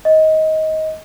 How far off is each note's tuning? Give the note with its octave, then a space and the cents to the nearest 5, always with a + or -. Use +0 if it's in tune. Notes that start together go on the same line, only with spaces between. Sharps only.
D#5 +20